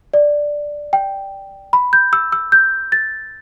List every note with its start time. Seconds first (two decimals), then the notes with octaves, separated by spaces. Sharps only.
0.14 D5
0.93 G5
1.73 B5
1.93 G6
2.13 E6
2.32 E6
2.52 G6
2.92 A6